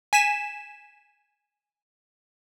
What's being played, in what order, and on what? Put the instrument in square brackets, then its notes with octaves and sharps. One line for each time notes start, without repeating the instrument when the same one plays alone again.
[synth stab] G#5 B6 E7